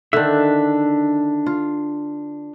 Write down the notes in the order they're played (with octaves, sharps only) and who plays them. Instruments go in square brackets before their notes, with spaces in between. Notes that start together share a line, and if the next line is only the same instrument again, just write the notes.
[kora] D3 D#3 [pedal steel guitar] D4 E5
[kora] F4